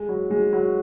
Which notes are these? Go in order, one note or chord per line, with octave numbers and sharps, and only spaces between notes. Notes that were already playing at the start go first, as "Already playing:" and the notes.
Already playing: G#3
F#3
G#3
F#3 F#4